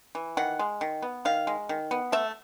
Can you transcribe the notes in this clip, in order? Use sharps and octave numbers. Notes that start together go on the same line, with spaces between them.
E3
D#3 F#5
G#3
D#3
B3
D#3 F5
G#3
D#3
B3
A3 E5